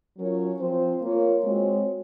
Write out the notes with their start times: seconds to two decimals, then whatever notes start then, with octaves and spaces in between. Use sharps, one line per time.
0.18 F#3 C#4 F4 A#4 C#5
0.60 F3 C4 F4 C5
1.02 A#3 F4 A#4 C#5
1.44 G#3 C4 F#4 C#5